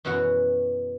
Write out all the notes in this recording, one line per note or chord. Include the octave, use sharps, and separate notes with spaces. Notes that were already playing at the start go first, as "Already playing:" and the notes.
F#2 B2 E3 F#4 F#5